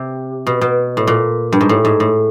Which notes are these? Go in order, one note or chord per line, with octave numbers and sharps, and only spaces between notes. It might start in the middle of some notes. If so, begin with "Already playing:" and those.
Already playing: C3
B2
B2
A2
A#2
G2
G#2
A2
G#2
A2